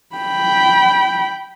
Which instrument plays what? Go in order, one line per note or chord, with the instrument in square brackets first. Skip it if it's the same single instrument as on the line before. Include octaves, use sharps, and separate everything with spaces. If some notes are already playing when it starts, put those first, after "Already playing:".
[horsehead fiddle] G5 B5